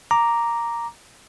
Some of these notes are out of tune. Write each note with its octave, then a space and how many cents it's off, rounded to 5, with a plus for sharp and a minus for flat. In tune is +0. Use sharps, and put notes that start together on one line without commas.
A#5 +0 D6 +0